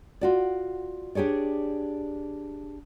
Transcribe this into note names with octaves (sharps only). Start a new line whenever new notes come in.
F4 F#4 D5
D4 G4 G#4 C#5 D5